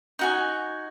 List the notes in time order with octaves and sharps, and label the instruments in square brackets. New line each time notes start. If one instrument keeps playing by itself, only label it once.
[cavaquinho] D#4 F#4 G#5